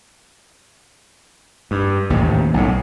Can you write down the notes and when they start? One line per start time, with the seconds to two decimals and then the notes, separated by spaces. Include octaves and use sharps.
1.71 G2
2.10 A1 D#2 G#2 C3
2.54 B1 A2